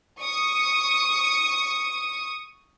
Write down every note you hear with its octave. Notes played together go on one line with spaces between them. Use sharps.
C#6 D#6